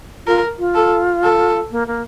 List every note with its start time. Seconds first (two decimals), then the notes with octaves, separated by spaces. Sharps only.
0.27 F4 A#4
0.59 F4
0.75 A4
1.23 A4
1.71 A#3
1.87 A#3